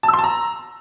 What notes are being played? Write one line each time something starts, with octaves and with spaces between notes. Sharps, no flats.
A5
E6
C6
A5
A#5